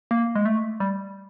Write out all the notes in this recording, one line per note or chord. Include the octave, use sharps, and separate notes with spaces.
A#3
G#3
A3
G3